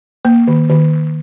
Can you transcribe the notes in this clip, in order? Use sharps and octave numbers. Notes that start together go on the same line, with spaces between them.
A#3
D#3
D#3